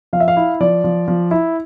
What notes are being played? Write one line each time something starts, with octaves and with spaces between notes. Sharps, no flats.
F3 F5
E5
F5
E4
F3 D5
F3
F3
E4